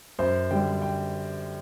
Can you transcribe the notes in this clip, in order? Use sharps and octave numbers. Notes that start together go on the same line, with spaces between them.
F#2 C5
D3 G3 G5
G5